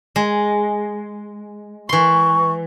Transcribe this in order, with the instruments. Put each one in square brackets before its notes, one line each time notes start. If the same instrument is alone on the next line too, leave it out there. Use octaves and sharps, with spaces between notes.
[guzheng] G#3
[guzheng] E3 C6 [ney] C#6